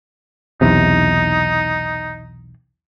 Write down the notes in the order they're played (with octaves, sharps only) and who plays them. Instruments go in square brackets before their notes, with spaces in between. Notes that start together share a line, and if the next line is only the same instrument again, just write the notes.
[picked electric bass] B1 E2 C3 [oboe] D#4